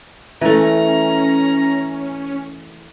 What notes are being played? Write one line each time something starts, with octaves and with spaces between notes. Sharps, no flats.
E3 A3 C#4 A#5